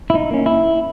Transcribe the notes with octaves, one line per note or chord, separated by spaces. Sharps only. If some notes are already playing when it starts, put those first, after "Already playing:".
E4
D#4
A#3 C#4
E4